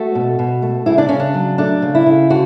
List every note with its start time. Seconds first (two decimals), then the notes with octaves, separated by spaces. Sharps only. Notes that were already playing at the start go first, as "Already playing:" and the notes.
Already playing: A3 F#4
0.15 B2
0.39 B2
0.62 A3
0.86 C#3 E4
0.98 D4
1.09 C#3 C#4
1.20 D4
1.34 F#3
1.58 A3 D4
1.82 C#3
1.95 E4
2.06 C#3
2.30 D3 F#4